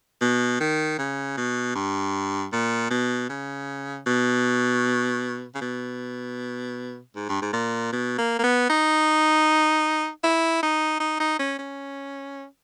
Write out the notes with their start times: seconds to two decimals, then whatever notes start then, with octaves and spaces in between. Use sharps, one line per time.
0.21 B2
0.60 D#3
0.98 C#3
1.37 B2
1.76 G2
2.53 A#2
2.91 B2
3.29 C#3
4.07 B2
5.55 C#3
5.61 B2
7.15 G#2
7.29 G2
7.42 G#2
7.53 A#2
7.92 B2
8.18 A#3
8.39 A#3
8.44 B3
8.69 D#4
10.24 E4
10.63 D#4
11.00 D#4
11.20 D#4
11.39 C#4
11.59 C#4